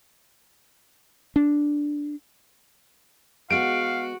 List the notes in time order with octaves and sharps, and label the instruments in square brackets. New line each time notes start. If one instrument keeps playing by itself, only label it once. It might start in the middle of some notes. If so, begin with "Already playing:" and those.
[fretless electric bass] D4
[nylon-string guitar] G#3 B3 [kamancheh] F#4 [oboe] F5 [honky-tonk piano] D7